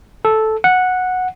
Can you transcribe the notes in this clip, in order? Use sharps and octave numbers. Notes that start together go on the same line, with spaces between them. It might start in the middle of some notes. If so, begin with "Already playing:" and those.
A4
F#5